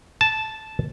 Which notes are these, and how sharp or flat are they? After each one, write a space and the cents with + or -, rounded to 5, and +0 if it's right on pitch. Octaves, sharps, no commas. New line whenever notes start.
A5 -10